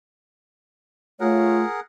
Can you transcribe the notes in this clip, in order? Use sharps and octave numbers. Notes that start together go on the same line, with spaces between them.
A3 F4 G#4 A#4 C#5 F#5